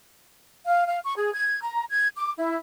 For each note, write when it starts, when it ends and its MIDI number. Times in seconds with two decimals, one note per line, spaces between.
0.67 0.85 77
0.87 1.00 77
1.04 1.16 85
1.17 1.33 68
1.34 1.62 92
1.62 1.84 82
1.89 2.09 92
2.16 2.32 86
2.37 2.56 64